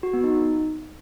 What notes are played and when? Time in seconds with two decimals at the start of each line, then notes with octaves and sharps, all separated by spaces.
0.03 F#4
0.13 B3
0.24 D#4